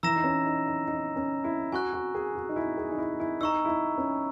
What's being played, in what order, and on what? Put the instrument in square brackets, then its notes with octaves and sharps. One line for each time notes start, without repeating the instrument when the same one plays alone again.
[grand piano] E3 [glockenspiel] A#5 E6 A#6 E7
[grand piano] D#4
C#4
D#4
D#4
D#4
C#4
E4
[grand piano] F#4 [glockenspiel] G#5 C#6 F#6
[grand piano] F#4
G#4
F#4
D#4
E4
G#4
D#4
E4
E4
[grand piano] D#4 [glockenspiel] A#5 C#6 E6
[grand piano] E4
D#4
C#4